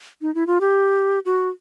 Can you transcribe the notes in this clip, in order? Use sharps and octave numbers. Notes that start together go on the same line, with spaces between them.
D#4
E4
F4
G4
F#4